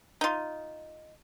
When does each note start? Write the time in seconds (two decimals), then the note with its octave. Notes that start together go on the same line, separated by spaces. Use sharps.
0.21 D#4 F4